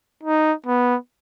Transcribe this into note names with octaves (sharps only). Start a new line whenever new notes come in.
D#4
B3